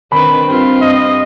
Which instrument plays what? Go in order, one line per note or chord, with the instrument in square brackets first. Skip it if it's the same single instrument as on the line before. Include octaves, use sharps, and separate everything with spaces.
[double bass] D#3 [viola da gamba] C4 D4 B4 [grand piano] B5
[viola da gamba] G2 F4 [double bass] C4
[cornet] D#5